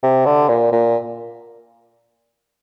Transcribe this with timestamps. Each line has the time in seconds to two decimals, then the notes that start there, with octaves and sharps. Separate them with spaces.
0.03 C3
0.26 D3
0.49 A#2
0.72 A#2